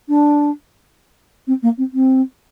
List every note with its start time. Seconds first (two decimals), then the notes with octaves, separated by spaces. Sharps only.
0.08 D4
1.47 C4
1.62 A#3
1.77 C4
1.93 C4